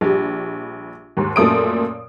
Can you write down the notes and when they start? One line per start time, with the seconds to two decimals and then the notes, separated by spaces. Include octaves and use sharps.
0.01 A#1 G3
1.17 D#2 G#2
1.36 F#2 A#2 A3 D#6 D7